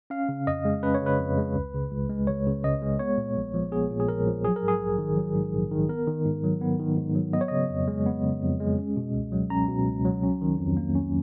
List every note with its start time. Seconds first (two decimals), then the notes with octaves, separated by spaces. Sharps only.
0.10 C#4 F5
0.29 C#3
0.47 F2 D#5
0.65 G#3
0.83 C#4 B4
0.95 C#5
1.01 C#3 B4
1.19 F2
1.37 G#3
1.55 C#2
1.74 C#3
1.91 C#2
2.09 G#3
2.27 C#2 C#5
2.46 C#3
2.64 C#2 D#5
2.82 G#3
2.99 B3 C#5
3.17 A#2
3.37 A#1
3.54 F3
3.72 B3 G#4
3.90 A#2
4.00 G#4
4.08 A#1 A#4
4.27 F3
4.45 F#3 G#4
4.56 A#4
4.62 G#2
4.68 G#4
4.80 A#1
4.98 D#3
5.17 F#3
5.35 G#2
5.53 A#1
5.71 D#3
5.89 B3 A#4
6.07 D#3
6.25 G#2
6.44 F#3
6.61 B3
6.79 D#3
6.97 G#2
7.15 F#3
7.33 B3 D#5
7.41 C#5
7.48 C#3 D#5
7.70 F2
7.88 G#3
8.06 B3
8.24 C#3
8.42 F2
8.60 G#3
8.79 C#4
8.96 B2
9.14 C#2
9.32 F#3
9.50 C#4 A#5
9.68 B2
9.86 C#2
10.05 F#3
10.23 C#4
10.41 D#3
10.59 F2
10.77 A#3
10.95 C#4